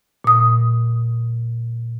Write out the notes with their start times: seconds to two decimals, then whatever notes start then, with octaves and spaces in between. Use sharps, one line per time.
0.24 A#2 D#6